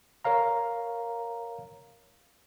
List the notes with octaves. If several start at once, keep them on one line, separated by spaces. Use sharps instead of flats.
A#4 C#5 F5 A#5